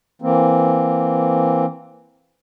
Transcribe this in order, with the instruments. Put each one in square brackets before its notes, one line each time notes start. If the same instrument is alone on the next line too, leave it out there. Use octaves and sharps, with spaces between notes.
[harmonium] E3 A#3 C4